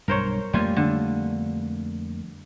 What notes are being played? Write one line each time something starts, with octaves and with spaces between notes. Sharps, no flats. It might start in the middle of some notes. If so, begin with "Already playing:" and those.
B1 G2 A#4 C5 C#5
F2 G3 A3 A#3 F4 G#5
D3